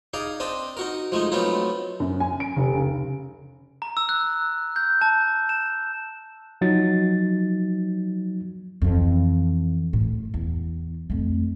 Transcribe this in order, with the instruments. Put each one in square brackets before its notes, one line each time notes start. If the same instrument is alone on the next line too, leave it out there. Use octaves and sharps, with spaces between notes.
[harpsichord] D#4 G#4 D5 F5
C4 D4 D#5 A5
D#4 F#4 A#4
F3 G#3 A3 D#4
F#3 A3 B3 C4 D#4 F4
[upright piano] F#2
G#5
D7
F1
C#2
[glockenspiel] A#5
E6
F#6
G6
A5
E7
[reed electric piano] F3 F#3 D#4 A6
[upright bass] F2 E3
A2
E2
F2 A3